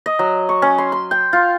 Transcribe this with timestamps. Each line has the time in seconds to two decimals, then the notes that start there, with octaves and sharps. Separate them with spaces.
0.06 D#5
0.19 F#3
0.49 C#6
0.62 C#4
0.78 C6
0.92 C6
1.11 G5
1.33 F4